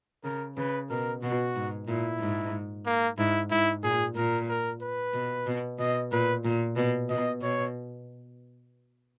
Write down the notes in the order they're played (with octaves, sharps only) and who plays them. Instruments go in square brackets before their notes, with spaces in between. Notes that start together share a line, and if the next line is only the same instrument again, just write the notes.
[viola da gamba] C#3 [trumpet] A#4
[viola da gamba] C#3 [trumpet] B4
[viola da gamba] B2 [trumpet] A#4
[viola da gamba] B2 [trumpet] F#4
[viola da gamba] G#2
[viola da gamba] A#2 [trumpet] E4
[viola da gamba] G#2
[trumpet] A#3
[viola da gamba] G#2 [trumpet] E4
[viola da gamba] G#2 [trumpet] E4
[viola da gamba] A#2 [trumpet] G#4
[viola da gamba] A#2 [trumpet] A#4
[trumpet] A#4
B4
[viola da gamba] B2
B2
[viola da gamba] B2 [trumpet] D#5
[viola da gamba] A#2 [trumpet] B4
[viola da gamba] A#2
B2
[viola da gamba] B2 [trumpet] D#5
[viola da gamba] B2 [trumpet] C#5